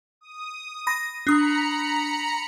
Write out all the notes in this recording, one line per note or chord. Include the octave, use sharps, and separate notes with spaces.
D#6
B5 A#6
D4 A#5 B5 D#6 C#7